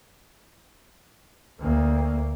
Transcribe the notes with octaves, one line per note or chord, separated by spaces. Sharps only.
D2 A#3